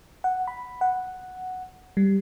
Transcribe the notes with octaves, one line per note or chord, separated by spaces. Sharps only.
F#5
B5
F#5
G3